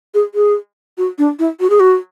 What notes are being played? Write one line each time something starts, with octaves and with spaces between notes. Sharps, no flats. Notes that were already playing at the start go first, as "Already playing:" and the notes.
G#4
G#4
F#4
D4
E4
F#4
G#4
F#4